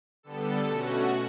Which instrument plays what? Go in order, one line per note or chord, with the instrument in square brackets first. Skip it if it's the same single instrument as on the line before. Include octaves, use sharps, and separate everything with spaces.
[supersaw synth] D3 G3 B3 A4
B2 A3 C#4 F#4